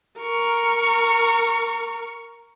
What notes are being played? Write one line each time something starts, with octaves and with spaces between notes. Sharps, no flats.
A#4 C#6